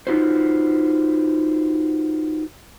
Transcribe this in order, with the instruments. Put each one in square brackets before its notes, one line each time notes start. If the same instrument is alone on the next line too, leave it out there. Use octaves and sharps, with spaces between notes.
[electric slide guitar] D#4 F4 F#4 B4 C5